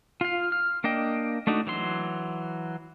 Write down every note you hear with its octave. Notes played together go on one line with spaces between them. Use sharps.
F4 F5
F6
A#3 D4 D#5 G5
A3 D4 D#4 F#4
E3 F#3 C6